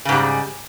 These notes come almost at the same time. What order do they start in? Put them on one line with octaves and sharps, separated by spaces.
C#3 G#2 G3